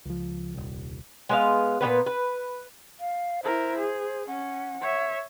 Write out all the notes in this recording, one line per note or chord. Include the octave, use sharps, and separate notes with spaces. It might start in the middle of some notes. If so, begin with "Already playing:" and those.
C#2 F3
D#1 C2
G#3 B3 F5
A#2 F#3 B3 B4
B4
F5
E4 A#4 C5
G#4
C#4 F#5
C#5 E5